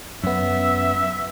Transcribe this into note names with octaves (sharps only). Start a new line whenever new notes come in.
F#2 B3 E5